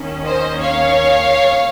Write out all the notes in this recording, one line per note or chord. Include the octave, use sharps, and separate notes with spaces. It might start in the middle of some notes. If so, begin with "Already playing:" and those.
Already playing: D#2 D#3 A#3 C#4
C5 D#5
C#5 F5